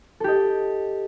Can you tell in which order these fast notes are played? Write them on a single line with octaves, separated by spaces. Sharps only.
A4 G4 D#5